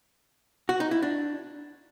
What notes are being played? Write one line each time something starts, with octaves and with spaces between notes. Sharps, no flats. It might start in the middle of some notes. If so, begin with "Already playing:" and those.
F#4
D#4
E4
D4